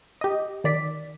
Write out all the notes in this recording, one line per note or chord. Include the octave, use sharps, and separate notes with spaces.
G4 D#5
D#3 D5 B6